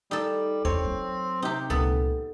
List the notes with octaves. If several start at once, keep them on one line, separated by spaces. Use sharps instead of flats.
G3 D#4 A4
E2 C4 C#5
F#3
C3 D#4 G4
C#2 A#2 B3 A4